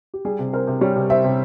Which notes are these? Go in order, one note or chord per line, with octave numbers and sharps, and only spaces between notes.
G4
G3 G#4
C3
C4 A#4
C3
G3 C#5
C3
C4 E5
C3